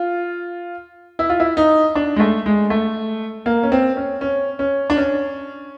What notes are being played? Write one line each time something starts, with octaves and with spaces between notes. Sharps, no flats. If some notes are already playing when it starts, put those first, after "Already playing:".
Already playing: F4
E4
F4
E4
D#4
D4
G#3
A3
G#3
A3
A#3
C#4
C4
C#4
C#4
C#4
D4
C#4